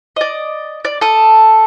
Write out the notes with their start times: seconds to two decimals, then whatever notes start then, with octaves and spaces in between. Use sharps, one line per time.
0.16 D5 D#5
0.85 D5
1.01 A4 D#6